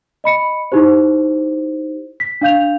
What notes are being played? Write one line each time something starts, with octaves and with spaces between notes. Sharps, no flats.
D#5 B5 C#7
D#4 E4 G4 C5
B6
D4 F5 G6 F7